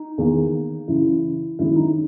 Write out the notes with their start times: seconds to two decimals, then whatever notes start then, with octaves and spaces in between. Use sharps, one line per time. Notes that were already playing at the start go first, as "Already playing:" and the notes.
Already playing: D#4
0.18 E2 D#3 A#3
0.88 F#2 C#3 E3 E4
1.59 F#2 D#3 G#3 E4
1.76 D#4